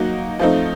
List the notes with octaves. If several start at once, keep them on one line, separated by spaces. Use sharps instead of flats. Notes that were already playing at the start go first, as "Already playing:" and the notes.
Already playing: F#3 A#3 D#4 F#4
F3 A3 C4 D#4 F4